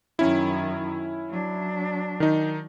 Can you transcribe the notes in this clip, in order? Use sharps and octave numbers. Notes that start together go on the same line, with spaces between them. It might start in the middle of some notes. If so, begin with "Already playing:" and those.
F#2 D#3 C#4 E4
F#3 D4
D#3 D#4